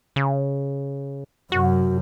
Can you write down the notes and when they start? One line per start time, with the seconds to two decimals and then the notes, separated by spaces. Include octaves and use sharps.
0.16 C#3
1.52 F#2 C3 F#4